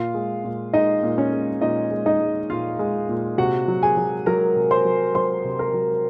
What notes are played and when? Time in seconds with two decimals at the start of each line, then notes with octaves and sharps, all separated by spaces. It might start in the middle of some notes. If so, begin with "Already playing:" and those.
Already playing: A#2 F4 F5
0.14 G#3
0.44 A#2
0.73 G#3 D#4 D#5
1.03 A#2
1.18 C#4 C#5
1.33 G#3
1.62 A#2 D#4 D#5
1.91 G#3
2.06 D#4 D#5
2.20 G#3
2.50 A#2 F4 F5
2.79 G#3
3.09 A#2
3.38 C3 F#4 F#5
3.68 F#3
3.82 G#4 G#5
3.97 F#3
4.26 F#3 A#4 A#5
4.56 C3
4.71 C5 C6
4.85 F#3
5.15 F#3 C5 C6
5.45 C3
5.59 A#4 A#5
5.74 F#3